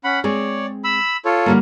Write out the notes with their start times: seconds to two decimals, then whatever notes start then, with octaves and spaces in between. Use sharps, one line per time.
0.04 C#4 F#5 B5
0.24 G#3 C4 G#4 C#5 D5
0.84 B5 E6
1.25 F4 A4 C#5
1.46 D3 G3 A#3